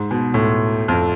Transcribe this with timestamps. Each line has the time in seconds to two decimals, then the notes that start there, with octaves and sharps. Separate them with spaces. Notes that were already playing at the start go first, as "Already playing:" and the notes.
Already playing: G#2
0.11 B2
0.34 A2
0.88 F2